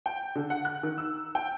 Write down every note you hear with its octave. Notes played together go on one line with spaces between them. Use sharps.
G5
D3
F#5
F#6
D#3
E6
G5